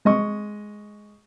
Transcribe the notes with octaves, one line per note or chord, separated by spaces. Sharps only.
G#3 D#5 C#6